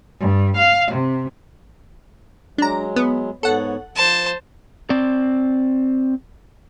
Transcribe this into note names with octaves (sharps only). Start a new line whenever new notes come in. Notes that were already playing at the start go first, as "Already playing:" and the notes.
G2
F5
C3
F#3 G#3 D4 A#5
B3
G#2 B3 A4 C#5 F#5
F3 C5 A5
C4 D5